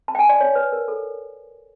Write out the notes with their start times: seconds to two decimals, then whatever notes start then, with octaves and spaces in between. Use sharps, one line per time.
0.08 A5
0.15 G5
0.19 G#5
0.29 D5
0.41 C#5
0.55 B4
0.72 A#4
0.88 A4